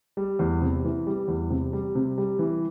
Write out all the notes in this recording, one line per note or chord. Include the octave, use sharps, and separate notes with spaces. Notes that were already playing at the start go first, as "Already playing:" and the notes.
G3
E2
C3
E3
G3
E2
C3
G3
C3
G3
E3